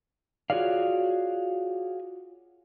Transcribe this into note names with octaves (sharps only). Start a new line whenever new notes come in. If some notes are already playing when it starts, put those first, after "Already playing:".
F4 F#4 G#4 C#5 D5 F5